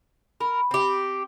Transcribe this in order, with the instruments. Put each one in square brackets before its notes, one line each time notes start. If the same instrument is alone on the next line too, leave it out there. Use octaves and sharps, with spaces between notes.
[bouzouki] A#4 [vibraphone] B5
[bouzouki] C4 G4